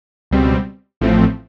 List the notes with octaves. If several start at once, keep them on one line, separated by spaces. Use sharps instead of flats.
C#2 B2 G3 C4
A1 A2 F3 A3 C4